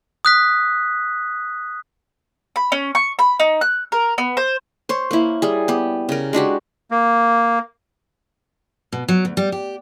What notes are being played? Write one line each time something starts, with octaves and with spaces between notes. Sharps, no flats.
D#6 F#6 B6
B5
C#4
C#6
B5
D#4
F#6
A#4
B3
C5
C5 C#5
A#3 E4
G3 G#4
B3 G4
C#3 A#4
G#3 D4 F#4 G4
A#3
B2
F#3
D2
G3
G4